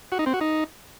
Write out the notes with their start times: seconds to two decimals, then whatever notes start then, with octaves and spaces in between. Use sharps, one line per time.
0.12 F#4
0.19 D#4
0.26 C4
0.33 F#4
0.41 D#4